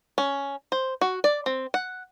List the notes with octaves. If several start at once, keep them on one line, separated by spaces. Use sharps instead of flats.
C#4
C5
F#4
D5
C4
F#5